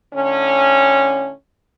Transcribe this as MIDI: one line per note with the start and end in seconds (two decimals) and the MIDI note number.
0.14 1.31 45
0.14 1.31 50
0.14 1.31 61